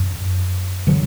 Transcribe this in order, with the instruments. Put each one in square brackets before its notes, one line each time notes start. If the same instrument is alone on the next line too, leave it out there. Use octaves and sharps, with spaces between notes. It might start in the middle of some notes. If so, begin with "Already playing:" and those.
Already playing: [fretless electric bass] F#2
D3 F#3